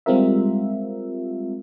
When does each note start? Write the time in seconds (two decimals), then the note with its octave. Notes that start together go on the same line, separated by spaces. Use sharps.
0.06 G3 G#3 C4 F4 A#4 E5